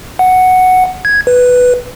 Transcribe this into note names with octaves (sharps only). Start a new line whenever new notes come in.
F#5
G#6
B4